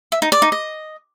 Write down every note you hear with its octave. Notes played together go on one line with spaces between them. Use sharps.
E5
D#4
D5
D#4
D#5